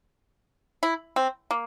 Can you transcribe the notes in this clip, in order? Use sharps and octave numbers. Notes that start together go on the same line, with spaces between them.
E4
C4
A#3